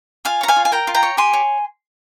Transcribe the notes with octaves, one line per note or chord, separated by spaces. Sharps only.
F4 F5 G#5
C#5 A#5
F5 G#5
F4
G#5
A#4 G5 A#5
F4
G5 A#5
C#5
G4 G#5 C6
C#5